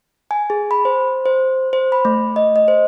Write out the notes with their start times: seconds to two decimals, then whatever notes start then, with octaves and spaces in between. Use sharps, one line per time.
0.31 G#5
0.50 G#4
0.71 B5
0.85 C5
1.26 C5
1.73 C5
1.92 B5
2.05 A3
2.36 D#5
2.56 D#5
2.68 C5